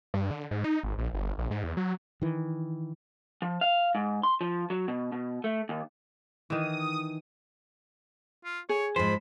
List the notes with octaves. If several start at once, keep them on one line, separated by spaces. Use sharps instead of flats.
G2
D3
G#2
D#4
G#1
A#1
G1
A#1
G#2
E2
F#3
D#3 E3
F3
F5
G#2
C6
F3
F#3
B2
B2
A3
D#2
D#3 E3 D#6
F4
G#4 C#5
G#2 F3 C5 B5